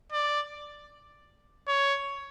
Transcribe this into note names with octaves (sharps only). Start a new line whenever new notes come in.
D5
C#5